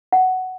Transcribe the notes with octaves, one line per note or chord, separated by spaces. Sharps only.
F#5